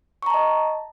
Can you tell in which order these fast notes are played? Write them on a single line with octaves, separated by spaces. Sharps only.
C#6 A#5 A5 D#5